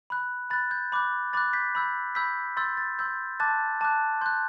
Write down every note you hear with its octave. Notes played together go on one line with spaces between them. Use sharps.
B5 F#6
B5 F#6 A6
G6
B5 D6 F#6
B5 D6 F#6 A6
G6 B6
B5 E6 G6
B5 E6 G6 B6
C6 E6 G6 A6
A6
C6 E6 G6
A5 D6 F#6 A6
A5 D6 F#6
C6 F#6 G6